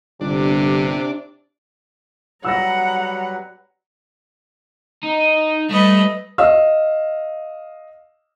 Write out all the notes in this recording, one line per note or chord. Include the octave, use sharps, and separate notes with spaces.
G1 C3 D4
F#3 G3 B4 F#5 A#5 E6 A#6
D#4
G3 A3 B4 D#5
D#5 F5 E6